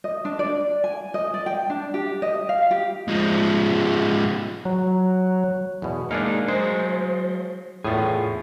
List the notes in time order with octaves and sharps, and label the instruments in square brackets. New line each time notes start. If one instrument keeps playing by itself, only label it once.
[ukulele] D#5
D4
D5
G#5
D#5
D5
G5
D4
G4
D#5
F5
G4
[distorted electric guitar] F3 G#3
[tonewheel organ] F#3
[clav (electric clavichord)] E2 B2
[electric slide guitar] G#3 A#3 D#4 [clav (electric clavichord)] D4 G#4 F5
[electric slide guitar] F#3 C5 [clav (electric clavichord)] G#3
[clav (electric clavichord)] E2 A2 [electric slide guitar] F4 G#4